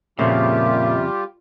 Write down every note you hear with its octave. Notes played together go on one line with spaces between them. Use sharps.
F2 A#2 C#3 G3 F4 G4 E5